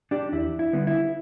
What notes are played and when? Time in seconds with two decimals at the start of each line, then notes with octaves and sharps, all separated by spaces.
0.11 D4 G4
0.32 E2 E4
0.59 E4
0.73 D3 G3 B3
0.87 E4